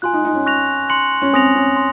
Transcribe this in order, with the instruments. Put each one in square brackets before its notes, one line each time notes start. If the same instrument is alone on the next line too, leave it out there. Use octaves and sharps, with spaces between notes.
[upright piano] F4 [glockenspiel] G#5 C6 F#6
[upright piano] D#4
D#4
C#4
[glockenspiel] C#6 F#6 A#6 F7
C6 F#6 C#7 F#7
[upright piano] C#4
[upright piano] C4 [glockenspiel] G#5 D#6 A#6 F7
[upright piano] C#4
[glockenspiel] C6